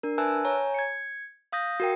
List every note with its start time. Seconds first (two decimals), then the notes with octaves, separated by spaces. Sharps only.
0.03 D4 A#4
0.18 B4 E5 G#5 A5 E6 F#6
0.45 C#5 G#5 A#5
0.74 G#6 C#7
1.52 F5 D#6 G6 A#6
1.80 F#4 A#4 G5